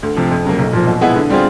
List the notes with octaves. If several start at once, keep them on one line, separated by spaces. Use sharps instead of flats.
D2
C3 F3
F2
C#3 F#3 A#3
B1
A#2 F3
B2
G#3 B3 E4 G#4
D3
G3 C4 F4 G#4